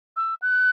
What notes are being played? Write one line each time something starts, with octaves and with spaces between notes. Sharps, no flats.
E6
F#6